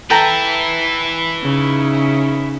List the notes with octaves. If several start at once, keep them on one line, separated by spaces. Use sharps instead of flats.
E4 A4 B4 G5 A#5
C#3 C#4 D#4